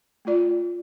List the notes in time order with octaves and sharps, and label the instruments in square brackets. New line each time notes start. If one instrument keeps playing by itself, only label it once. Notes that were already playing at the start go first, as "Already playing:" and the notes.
[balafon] A3 F4 D5